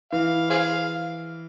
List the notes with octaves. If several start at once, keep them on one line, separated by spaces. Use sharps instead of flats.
E3 F5
G#4 C5 F5